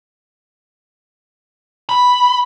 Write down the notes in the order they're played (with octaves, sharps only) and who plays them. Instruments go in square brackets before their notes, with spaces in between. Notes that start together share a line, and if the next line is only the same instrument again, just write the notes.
[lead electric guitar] B5